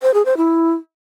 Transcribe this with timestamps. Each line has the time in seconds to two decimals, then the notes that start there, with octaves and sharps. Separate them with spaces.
0.02 C5
0.14 G#4
0.25 C5
0.37 E4